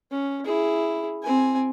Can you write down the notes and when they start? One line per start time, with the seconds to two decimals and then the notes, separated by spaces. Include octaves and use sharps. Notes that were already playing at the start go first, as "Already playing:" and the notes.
0.11 C#4
0.45 E4 G#4
1.23 C4 G#5